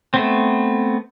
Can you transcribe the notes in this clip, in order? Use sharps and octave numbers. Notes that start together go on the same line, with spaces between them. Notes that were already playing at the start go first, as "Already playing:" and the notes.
A3 B3 C4